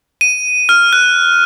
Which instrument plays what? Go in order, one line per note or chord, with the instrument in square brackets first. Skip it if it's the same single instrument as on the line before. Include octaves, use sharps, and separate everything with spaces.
[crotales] D#7
F6
F#6